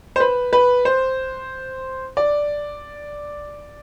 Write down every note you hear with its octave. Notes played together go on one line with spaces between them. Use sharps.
C5
B4
B4
C5
D5